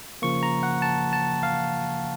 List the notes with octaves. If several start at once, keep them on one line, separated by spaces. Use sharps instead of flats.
C#3 F3 A#3 C#6
A#5
F#5
A5
A5
F5